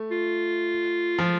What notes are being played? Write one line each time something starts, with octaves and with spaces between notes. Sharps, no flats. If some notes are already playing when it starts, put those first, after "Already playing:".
Already playing: A3
F4
F3